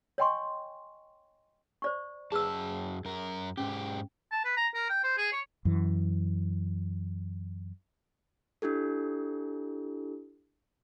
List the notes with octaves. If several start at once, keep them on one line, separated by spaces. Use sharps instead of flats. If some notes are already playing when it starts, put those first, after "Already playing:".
C#5 D#5 G5 G#5 C6 C#6
C5 D5 C#6
F#2 G#4 B4 A5 E6
F#2 A#4
G#2 C#4 G4
A5
B4
A#5
A#4
G5
C5
G#4
C#5
F#2 E3
D4 E4 G4 A4